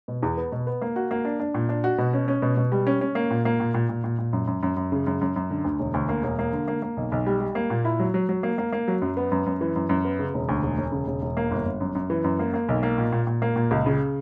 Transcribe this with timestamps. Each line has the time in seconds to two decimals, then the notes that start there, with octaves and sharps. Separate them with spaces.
0.08 B2
0.22 E2
0.37 B3
0.52 B2
0.67 B3
0.82 A#3
0.96 F#4
1.11 A#3
1.25 D4
1.40 D4
1.54 A#2
1.69 D4
1.84 F#4
1.98 B2
2.13 C#4
2.28 C#4
2.42 B2
2.57 B2
2.72 G3
2.87 C#4
3.01 C#4
3.15 A#3
3.31 A#2
3.45 A#3
3.60 A#2
3.74 A#2
3.89 A#2
4.04 A#2
4.18 A#2
4.33 F#2
4.47 F#2
4.63 F#2
4.77 F#2
4.92 C#3
5.07 F#2
5.21 F#2
5.36 F#2
5.50 D3
5.64 D2
5.79 E1
5.94 D2
6.09 A#3
6.23 E1
6.39 A#3
6.53 D3
6.68 A#3
6.82 A#3
6.97 B1
7.12 B1
7.26 G3
7.41 G3
7.55 A#3
7.70 A#2
7.85 E4
8.00 F#3
8.14 F#3
8.29 F#3
8.43 A#3
8.58 A#3
8.72 A#3
8.88 F#3
9.02 F#2
9.17 B3
9.32 F#2
9.46 F#2
9.61 E3
9.76 F#2
9.89 F#2
10.05 B3
10.19 C#3
10.34 E1
10.49 D2
10.63 E1
10.78 E1
10.92 C#3
11.07 E1
11.22 E1
11.37 A#3
11.51 G1
11.65 G1
11.81 F#2
11.95 F#2
12.10 E3
12.24 F#2
12.39 A#3
12.54 A#3
12.69 B1
12.83 A#3
12.98 A#2
13.12 A#2
13.27 A#2
13.42 A#3
13.56 A#2
13.71 C#2
13.86 C#3